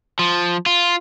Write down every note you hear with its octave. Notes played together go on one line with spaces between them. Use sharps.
F3
F4